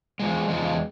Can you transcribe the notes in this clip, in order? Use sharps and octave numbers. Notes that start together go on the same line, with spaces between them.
E2 C#3 F3 G#3
E2 C#3 F3 G#3